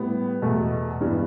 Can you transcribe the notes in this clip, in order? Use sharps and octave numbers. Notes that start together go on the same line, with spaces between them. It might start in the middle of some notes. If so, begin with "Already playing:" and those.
Already playing: A2 G3 B3
E2 B2 A3
G2 E3 G3 B3 D4